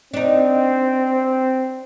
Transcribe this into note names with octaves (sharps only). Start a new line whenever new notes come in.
C4 D4 D#4